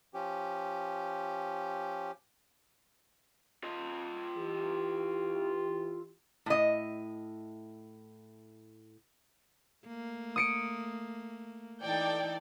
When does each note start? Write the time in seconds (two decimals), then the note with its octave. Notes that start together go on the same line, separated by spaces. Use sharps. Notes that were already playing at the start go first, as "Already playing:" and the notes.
0.14 F3 C#4 G4
3.64 F4 D#5
4.36 E3 G4
6.46 A2 D#5
9.86 A3 A#3
10.36 D#6 C#7 D7
11.81 E3 D#4 A4 D5 G5